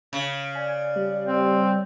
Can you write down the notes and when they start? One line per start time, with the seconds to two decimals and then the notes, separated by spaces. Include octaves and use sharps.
0.13 C#3
0.55 D5 G#5
0.96 G3
1.27 C4